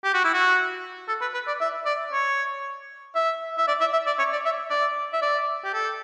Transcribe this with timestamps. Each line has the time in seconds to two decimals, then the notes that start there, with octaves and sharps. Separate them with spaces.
0.04 G4
0.14 F#4
0.24 E4
0.34 F#4
1.08 A4
1.21 B4
1.34 B4
1.47 D5
1.61 E5
1.85 D5
2.12 C#5
3.15 E5
3.58 E5
3.68 D5
3.80 E5
3.92 E5
4.07 D5
4.18 C#5
4.32 D5
4.45 E5
4.70 D5
5.13 E5
5.22 D5
5.64 G4
5.74 A4